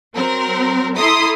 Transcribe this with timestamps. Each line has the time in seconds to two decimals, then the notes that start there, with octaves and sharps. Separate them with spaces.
0.14 F#3 C4 A#4
0.97 E4 A4 A#5 C6 D#6